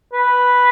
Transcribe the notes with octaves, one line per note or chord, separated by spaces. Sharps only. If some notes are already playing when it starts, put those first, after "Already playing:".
B4